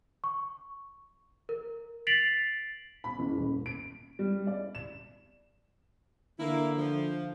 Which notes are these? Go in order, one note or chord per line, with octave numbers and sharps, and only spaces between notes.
C#6
A#4
A6 B6 C7 D7 F7 F#7
B5
F#1
D#1
D7
G3
D5
E7
D3 A#3 E4
F3